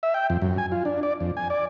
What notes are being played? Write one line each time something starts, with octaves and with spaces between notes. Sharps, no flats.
E5
G5
F2
F#2
G#5
F4
D4
D5
F2
G#5
D5